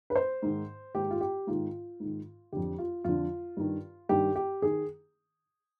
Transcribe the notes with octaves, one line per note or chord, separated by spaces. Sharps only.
B4
C5
G#2 D#3
G#2 D#3 G4
F4
G4
G#2 D#3 F4
G#2 D#3
F2 D3 G4
F4
F2 D3 F4
G2 D#3
G2 D#3 G4
G4
D#3 G#4